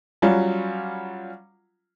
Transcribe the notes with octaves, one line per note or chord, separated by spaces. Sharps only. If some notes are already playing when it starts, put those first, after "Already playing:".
F#3 G3 C#4 F4